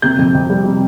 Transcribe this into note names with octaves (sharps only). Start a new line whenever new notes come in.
C3 G6
F2
F2
G3
C3